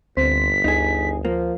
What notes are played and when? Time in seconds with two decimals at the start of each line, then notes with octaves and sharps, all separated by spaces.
0.17 G1 D2 C4 C5 B6
0.64 D2 D#4 G#4
1.25 F3 A#3